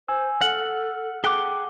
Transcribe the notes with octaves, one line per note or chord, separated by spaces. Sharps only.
C5 G#5 E6
A4 F#5 F6 F#7
G#4 A4 F#5 G5 D6 F#6 G7